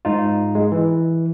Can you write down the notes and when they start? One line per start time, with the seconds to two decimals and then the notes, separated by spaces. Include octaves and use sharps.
0.05 G#2 D#4 F4
0.55 G#3
0.72 E3